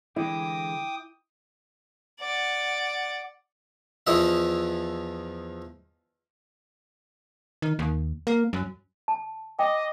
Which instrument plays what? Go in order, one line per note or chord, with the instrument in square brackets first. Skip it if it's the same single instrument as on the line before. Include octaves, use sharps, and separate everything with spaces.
[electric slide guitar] D3 E3 G#3 [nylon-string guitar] E4 [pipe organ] G5 D6 D#6
[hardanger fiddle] D5 F#5
[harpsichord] E2 E3 F3 F4 D#5 E5
[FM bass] D#3
D#2
A#3
F#2
[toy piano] A5
[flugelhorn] D#5 [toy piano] G5 [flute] D6